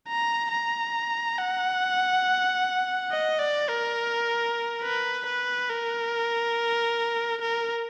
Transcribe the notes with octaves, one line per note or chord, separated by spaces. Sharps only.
A#5
A#5
F#5
D#5
D5
A#4
B4
B4
A#4
A#4